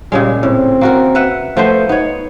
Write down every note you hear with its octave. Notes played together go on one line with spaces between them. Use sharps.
A#2 C#3 G3 G#3
A2 C4
A#3 F#4 A#4
B4 E5 F#5
F3 A3 B3 C5
B3 D#4 C#5